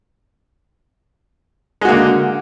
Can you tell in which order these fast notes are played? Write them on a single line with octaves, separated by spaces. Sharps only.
G#3 F#4 A#3 D3